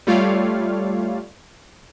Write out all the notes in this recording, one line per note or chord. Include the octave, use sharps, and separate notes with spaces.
G3 A3 F4 C#5 D5 F5